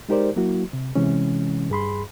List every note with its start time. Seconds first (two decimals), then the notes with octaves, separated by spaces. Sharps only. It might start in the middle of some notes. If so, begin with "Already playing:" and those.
0.09 G#3 D#4 G4 A#4 C5 D5
0.36 F#3 A#3 E4 F#4
0.73 C3
0.95 C3 E3 G#3 C#4
1.70 G2 G#4 B5 C6